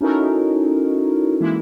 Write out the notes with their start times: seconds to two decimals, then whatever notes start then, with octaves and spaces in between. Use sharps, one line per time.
0.01 C#4 D#4 E4 F#4 A4 A#4
1.40 E3 G#3 A#3 E4